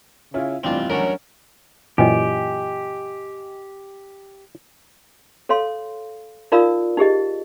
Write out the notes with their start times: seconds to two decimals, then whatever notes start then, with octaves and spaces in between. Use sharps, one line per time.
0.34 C#3 C#4 E4 F4
0.64 F1 E2 G2 C4 D4 F4
0.90 F#3 C#4 D4 A#4
1.98 F#2 A#2 E3 G4 D#5 G5 G#5
5.49 A4 C#5 F5 C6
6.52 D#4 F4 A#4 D5 F5 D#6
6.97 D#4 G4 G#4 D#5